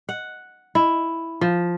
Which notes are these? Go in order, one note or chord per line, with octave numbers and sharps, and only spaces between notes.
F#5
E4
F3